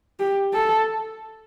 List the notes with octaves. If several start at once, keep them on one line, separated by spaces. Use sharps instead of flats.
G4
A4